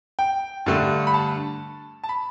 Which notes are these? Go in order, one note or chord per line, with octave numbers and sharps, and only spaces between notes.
G5
G2 D3 A3
B5
A5
A5
B5